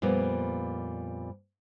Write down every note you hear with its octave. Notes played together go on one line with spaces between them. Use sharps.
F2 A#2 G3 A#3 B3